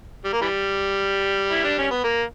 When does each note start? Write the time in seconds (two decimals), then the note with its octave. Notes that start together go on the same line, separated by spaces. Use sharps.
0.25 G3
0.33 A#3
0.42 E3 G3
1.52 E4
1.65 D4
1.79 C#4
1.91 B3
2.04 A#3